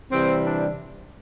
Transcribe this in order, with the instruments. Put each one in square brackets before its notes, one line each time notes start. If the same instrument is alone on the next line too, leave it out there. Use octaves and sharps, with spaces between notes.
[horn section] C3 E3 G3 C4
D4